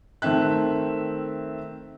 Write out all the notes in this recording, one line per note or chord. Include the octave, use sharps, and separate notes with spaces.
D#3 A3 C4 E5 F#6